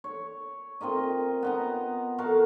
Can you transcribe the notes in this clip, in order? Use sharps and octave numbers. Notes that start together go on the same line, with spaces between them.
C#5
C4 F4 A#4 D#5
B3 D#5 A#5
F#4 A4 A#4 F5